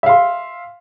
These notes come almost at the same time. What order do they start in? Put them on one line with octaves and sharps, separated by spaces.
E5 F5 C6